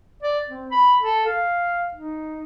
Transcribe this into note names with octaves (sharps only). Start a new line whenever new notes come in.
D5
C4
B5
A4
F5
D#4